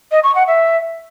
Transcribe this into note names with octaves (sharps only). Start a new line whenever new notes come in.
D#5
C#6
F#5
E5